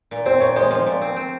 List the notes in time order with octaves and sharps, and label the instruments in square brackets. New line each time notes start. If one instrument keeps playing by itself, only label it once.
[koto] A#2
[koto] C4 [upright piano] C5
[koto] A#2 [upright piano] C#5
[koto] G#3 [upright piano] C5
[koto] F3 [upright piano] C5
[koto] A#2
C4
C4